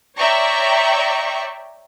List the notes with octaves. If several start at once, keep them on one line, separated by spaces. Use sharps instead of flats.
C#5 D5 E5 G5 A#5 C#6